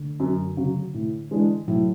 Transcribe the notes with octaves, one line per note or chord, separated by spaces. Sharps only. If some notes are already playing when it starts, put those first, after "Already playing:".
Already playing: D3
F#2
C#3 F#3
A2
E3 G#3 D4
A2 F#3